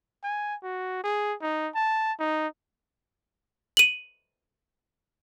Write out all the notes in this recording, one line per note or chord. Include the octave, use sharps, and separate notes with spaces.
G#5
F#4
G#4
D#4
A5
D#4
D#7 F#7